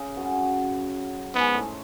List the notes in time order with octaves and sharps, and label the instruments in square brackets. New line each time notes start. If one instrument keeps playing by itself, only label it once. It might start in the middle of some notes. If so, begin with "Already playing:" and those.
Already playing: [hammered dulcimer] C#3
F#2 F#3
[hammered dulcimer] G#2 G#3 [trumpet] B3
[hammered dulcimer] A2 A3